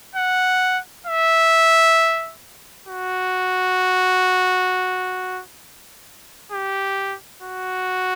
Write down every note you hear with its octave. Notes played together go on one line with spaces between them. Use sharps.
F#5
E5
F#4
G4
F#4